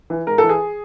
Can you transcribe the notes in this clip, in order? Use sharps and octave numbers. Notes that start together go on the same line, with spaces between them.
E3
G#2 A#4
A4
E3
G#4